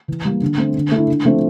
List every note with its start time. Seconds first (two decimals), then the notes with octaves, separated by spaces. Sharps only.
0.08 E3
0.25 G3 A#3
0.42 D3
0.58 A3 C4
0.76 D3
0.92 A3 E4
1.08 D3
1.25 F3 A3 C4